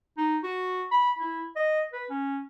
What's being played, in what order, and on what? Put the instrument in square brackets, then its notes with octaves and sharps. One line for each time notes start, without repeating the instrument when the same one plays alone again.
[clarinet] D#4
F#4
B5
E4
D#5
B4
C#4